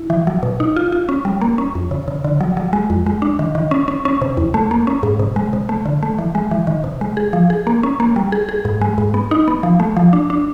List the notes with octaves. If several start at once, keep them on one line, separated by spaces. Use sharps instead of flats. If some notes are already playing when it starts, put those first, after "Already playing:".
Already playing: E4
E3
F#3
B2
D#4
F4
F4
C#4
G3
A#3
C#4
F2
C#3
C#3
D3
F#3
F#3
G#3
F2
G#3
D4
D#3
D#3
C#4
C#4
C#4
C3
E2
A3
A#3
C#4
G#2
C3
G#3
C3
A3
D3
A3
E3
G#3
E3
D#3
C3
G#3
G#4
F3
G#4
A#3
C#4
A#3
G3
G#4
G#4
G#2
G#3
G#2
B3
D#4
B3
F3
A3
F3
D4
D4